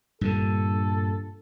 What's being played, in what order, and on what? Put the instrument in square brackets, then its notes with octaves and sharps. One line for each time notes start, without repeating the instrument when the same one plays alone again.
[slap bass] G2 A#2 D3 [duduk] A4